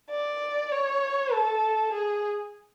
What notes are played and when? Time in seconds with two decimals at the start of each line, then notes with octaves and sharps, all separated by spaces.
0.10 D5
0.72 C#5
1.32 A4
1.93 G#4